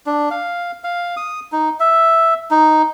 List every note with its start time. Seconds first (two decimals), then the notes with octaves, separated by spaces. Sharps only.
0.06 D4
0.31 F5
0.84 F5
1.17 D#6
1.52 D#4
1.80 E5
2.51 D#4